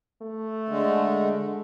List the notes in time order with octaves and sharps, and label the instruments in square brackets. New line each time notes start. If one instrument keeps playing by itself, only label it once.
[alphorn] A3
[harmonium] D3 G#3